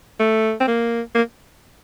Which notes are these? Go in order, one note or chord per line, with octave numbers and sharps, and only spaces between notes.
A3
C4
A#3
A#3